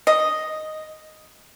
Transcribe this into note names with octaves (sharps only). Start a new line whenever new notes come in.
D#5